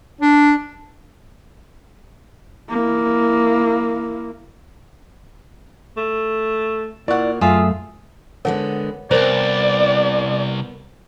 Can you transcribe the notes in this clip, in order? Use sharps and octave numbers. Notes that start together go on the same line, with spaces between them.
D4
A#3 E4
A3
A#2 E4 C#5 D5 F#5
F#2 A3 F4 G#4 E5 D#6
D3 G#3 B3 A#4 C#5 F#5
C2 B3 A#4 C5 D5